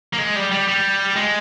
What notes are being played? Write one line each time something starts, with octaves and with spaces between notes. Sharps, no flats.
A#3
G#3
G3
G3
G3
G#3